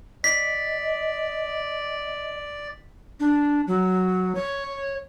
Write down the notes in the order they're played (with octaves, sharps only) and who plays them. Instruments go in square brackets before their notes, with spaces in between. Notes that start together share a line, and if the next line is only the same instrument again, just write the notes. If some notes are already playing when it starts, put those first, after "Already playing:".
[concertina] D5 [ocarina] D#5 [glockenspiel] B6
[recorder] D4
F#3
C#5